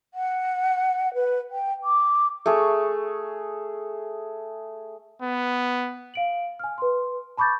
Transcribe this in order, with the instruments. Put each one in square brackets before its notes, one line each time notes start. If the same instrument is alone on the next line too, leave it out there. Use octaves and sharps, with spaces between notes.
[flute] F#5
B4
G5
D6
[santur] A3 G#4
[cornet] B3
[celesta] F5 D7 F#7
G#5 F6
B4 C6
A5 B5 C#6 D6 G6 A6